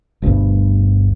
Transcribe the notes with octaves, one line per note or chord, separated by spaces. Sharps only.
G1 D2 G2 B2